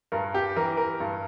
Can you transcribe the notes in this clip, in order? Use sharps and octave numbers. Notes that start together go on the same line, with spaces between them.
G2 A#4
G4
E3 A#4
A#4
G2